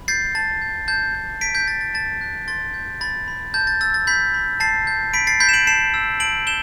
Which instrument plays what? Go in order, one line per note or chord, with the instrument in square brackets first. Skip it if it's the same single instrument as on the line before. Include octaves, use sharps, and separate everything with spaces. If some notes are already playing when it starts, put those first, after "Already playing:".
Already playing: [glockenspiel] B5
G6 A6 C7
A5 A6
G6
A5 G6
G6
A5 B6 D7
G6 B6
G6 A6
A6
A5 A6
F#6
C6 A6
G6
B5 A6
B5
A5 G6
A6
E6 A6
A6
B5 G6 B6
B5
A5 A6 C7
G6
B5 B6 D7
A6 C7
B5 G6 B6
E7
D7 F#7
A5 C7 E7
E6
A5 D7 F#7
G6 E7 G7